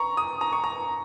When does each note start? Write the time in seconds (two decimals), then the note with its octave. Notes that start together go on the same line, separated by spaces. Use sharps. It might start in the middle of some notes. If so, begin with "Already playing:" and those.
Already playing: A#5 C#6
0.17 D#6
0.41 A#5
0.53 C#6
0.64 A#5